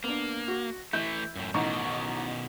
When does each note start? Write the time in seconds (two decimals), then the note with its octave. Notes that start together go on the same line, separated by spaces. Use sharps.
0.04 A#3 B3 D4
0.48 F#4
0.93 E3 A3 E4 G6
1.36 F#2 A2
1.54 A1 B2 D#3 D#4 C#6